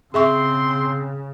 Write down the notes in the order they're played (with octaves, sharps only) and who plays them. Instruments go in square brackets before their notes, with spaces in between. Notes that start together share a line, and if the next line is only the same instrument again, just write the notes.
[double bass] C#3 [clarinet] C4 [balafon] G#4 E5 C#6 [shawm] C6